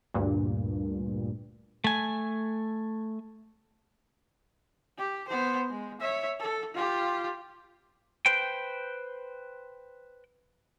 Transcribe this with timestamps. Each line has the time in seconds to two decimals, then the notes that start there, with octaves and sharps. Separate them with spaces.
0.14 D2 G2 A#2
1.84 A3 G#5
4.98 G4
5.28 B3 C5
5.70 G#3
6.00 C#5 E5
6.39 A4
6.74 F4 G4
8.26 B4 C5 G5